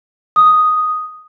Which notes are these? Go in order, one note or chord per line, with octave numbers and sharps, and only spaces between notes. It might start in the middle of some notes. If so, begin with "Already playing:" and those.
D#6